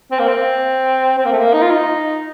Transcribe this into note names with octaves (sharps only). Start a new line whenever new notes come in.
C4
A#3
C4
C4
A#3
A3
A#3
D#4
F4
D#4